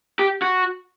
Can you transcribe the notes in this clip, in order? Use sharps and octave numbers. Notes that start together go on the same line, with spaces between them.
G4
F#4